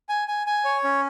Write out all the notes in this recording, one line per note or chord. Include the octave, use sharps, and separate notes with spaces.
G#5
G#5
G#5
C#5
C#4